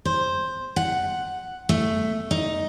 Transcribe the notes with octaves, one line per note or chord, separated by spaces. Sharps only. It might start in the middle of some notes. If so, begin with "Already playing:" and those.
C5
F#5
A3
D#4